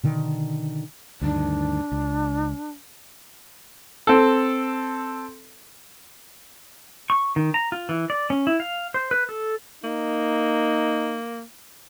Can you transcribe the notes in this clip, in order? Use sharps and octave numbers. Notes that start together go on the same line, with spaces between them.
B2 D3 D#3
D2 G2 D#3 D4
C#2
C4 A4
C#6
D#3
A#5
F4
E3
D5
C#4
E4
F5
C5
B4
A4
A#3 D#4